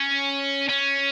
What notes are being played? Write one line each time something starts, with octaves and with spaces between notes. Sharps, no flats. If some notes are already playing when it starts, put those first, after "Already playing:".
Already playing: C#4
C#4